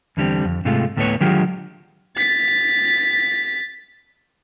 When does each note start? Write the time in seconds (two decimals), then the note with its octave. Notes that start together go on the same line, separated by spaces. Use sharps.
0.17 E2 D3 G3 C4
0.45 F2
0.65 G#2 C3 G#3 A3 F4
0.97 D2 A2 A3 B3 B4 C#5
1.21 D3 D#3 F#3 G#3 F4 G4
2.17 A6 B6